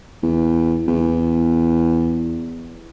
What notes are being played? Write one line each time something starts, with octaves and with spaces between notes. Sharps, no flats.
E2
E2